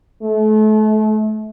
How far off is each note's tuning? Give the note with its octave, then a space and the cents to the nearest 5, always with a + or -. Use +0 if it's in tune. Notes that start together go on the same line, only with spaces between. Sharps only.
A3 -35